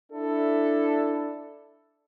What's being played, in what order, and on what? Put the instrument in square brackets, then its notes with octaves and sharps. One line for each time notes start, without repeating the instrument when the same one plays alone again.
[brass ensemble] D4 E4 A4